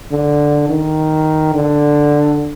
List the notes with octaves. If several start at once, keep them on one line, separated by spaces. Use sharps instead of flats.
D3
D#3
D3